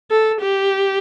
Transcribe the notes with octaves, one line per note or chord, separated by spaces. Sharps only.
A4
G4